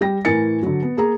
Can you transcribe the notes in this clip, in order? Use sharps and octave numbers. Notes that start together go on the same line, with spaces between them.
G3 G5 A#6
A2 E3 A#4 G#5 A6 C#7
D3 F#3
B3
A#3 G#4 A#5